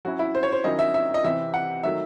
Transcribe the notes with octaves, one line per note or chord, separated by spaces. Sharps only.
F#3 C#4 E4 F#4
E4
C5
C#5
C5
D#3 F#3 C#4 E4 D#5
E5
E5
D#5
C3 E3 C4 E5
F#5
D#3 F#3 A3 D#4 E5